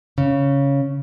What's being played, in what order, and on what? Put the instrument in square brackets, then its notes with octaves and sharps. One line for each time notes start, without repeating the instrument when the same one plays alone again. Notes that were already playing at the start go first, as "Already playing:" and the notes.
[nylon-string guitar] C#3